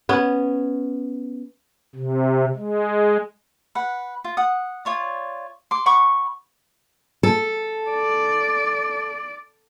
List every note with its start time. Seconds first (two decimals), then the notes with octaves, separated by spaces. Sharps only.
0.09 B3 C#4
1.96 C3
2.56 G#3
3.75 B4 F#5
4.24 F4
4.37 F#5 D#6
4.85 F4 C#5 D5
5.71 C6 D6
5.86 F#5 B5 C#6 D6
7.23 A4
7.90 D5